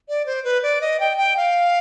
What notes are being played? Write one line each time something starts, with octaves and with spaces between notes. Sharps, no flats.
D5
C5
B4
D5
D#5
G5
G5
F5